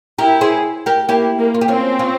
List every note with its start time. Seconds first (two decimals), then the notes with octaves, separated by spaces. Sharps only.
0.18 E4 G4 A#4
0.41 G#4 C5
0.86 G4 A#4
1.09 A#3 E4 G4
1.39 A#3
1.54 F4
1.61 G4
1.68 C4 C#4 F4
1.99 C#4 F4